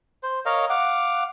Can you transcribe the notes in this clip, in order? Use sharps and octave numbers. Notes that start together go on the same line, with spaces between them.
C5
A#4 C#5 D#5 F5
F5 F#5 D6